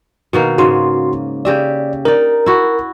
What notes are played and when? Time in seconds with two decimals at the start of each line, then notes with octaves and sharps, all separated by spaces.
0.33 B2 D#3 A#3
0.58 G#2 C#3 F#4 C6
1.45 C#3 G4 D5 E5
2.05 D#4 A#4 D5
2.46 E4 F#4